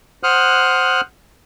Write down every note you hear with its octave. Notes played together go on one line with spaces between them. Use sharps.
C5 F#5 D#6 F6 F#6